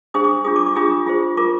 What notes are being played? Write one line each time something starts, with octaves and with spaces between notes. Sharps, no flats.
D4 G#4 C5 D#6
D6
D4 F4 G#4 D#6
D6
D6
D4 F4 G#4 D#6
F4 G#4 C5
F4 A#4 D6